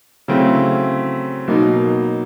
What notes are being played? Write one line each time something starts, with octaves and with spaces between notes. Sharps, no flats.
C#3 F#3 A3 C4 E4
B2 F#3 A#3 D#4